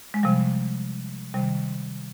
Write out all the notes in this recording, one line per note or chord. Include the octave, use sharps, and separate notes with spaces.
G#3
C3 F3 G3
C3 D#3 G3